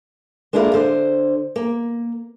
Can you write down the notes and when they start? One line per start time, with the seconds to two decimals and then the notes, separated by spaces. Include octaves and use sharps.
0.53 G#3 A#3 D4 E4 F4 A#4
0.74 D3 C5
1.56 A#3